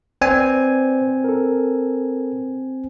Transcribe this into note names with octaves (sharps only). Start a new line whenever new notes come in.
C4 B4 C5 D5 G#5
A4 A#4